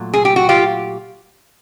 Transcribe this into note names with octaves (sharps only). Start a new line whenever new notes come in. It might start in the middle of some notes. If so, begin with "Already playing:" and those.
Already playing: A#2 F#3 A3
G#4
G4
F#4
F4 G4